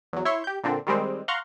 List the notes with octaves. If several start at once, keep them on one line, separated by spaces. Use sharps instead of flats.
E2 F#3
E4 C#5 E5 C6 C#6
G4 G6
A#2 D3 C4 D4
D#3 G3 G#3 C4
F5 F#5 A#5 C6 C#6